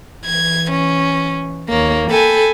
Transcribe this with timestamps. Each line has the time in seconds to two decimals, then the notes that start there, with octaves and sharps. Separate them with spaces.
0.26 E3 G#6
0.71 C#4
1.69 D#2 A#3 C#5
2.10 A4 G5 G#5 B5